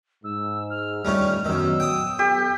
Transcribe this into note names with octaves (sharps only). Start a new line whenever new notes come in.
G#2 E6
F6
G1 F2 D#3 G3 A3 C#4
F#2 D#3 F#3 B3 E6
G5 D#6
B3 G4 A4